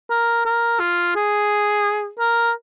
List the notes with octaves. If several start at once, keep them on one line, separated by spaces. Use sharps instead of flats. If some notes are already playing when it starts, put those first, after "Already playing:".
A#4
A#4
F4
G#4
A#4